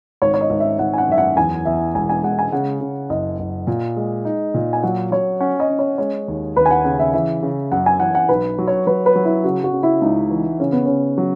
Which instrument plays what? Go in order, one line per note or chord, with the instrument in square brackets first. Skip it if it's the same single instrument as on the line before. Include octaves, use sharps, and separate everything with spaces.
[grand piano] G#1 [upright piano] C#5
[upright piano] C#5
D#5
[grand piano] G#1
[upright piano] E5
[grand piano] G#1 [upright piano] F#5
[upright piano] G#5
F#5
[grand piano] F#2 [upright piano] E5
[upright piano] F#5
[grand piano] E2 [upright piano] G#5
[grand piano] E2 [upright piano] E5
[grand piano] E1 [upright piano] G#5
[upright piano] G#5
[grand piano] G#3 [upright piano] F#5
[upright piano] G#5
[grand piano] C#3 [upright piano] F#5
[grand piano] C#3
[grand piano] F#1 [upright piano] D#5
[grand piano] F#1
A#2
G#3
D#4
A#2
[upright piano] G#5
[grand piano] F#3 [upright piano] F#5
[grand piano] F#3 [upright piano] C#5
[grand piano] C#4 [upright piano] F#5
[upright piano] D#5
[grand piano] C#4
[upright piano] C#5
[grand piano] G#3 [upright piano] C#5
[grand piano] D#2
[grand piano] D#2 [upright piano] B4
[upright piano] G#5
F#5
[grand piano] C#3 [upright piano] F#5
[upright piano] E5
[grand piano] E3 [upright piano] E5
[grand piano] C#3
[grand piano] F#2 [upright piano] F#5
[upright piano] G#5
[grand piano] E3 [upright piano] F#5
[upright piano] F#5
[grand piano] B1 [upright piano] B4
[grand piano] F#3
[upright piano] C#5
[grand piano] F#3 [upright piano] B4
[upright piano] B4
[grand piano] F#3
[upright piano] E4
[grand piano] C#3 [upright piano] F#4
[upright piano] F#4
[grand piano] C#3
[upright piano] E4
[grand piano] C#2 [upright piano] D#4
[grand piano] E3
[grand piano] C#3 [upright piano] C#4
[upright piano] B3
[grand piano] C#3 [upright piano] C#4
[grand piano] F#3